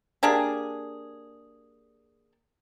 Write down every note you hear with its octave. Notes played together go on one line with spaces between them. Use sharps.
A#3 D4 G4 G#4